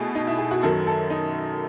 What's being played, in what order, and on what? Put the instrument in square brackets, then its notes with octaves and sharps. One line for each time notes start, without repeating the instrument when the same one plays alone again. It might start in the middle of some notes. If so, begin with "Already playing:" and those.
Already playing: [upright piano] B2 A3 E4 G#4
D#4
E4
G#4
F#4
F#2 D#3 F#3 A4
A4
D#4